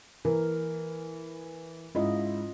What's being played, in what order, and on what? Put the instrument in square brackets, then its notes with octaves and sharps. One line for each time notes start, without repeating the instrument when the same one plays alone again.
[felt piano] E3 [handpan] A#4
[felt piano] G#2 E4 [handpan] C#4 F4 D#5